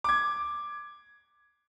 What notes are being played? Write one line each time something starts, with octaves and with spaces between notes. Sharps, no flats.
D6 G#6